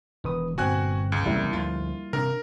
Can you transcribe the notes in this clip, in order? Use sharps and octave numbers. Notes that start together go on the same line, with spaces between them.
E1 D#3 B4 D#6
G1 A#2 C4 F#4 G5 G#5 F#6
C#2
A1 E2 C3 G3 A#3 E4
D2 F3 F4
C3 D4 A#4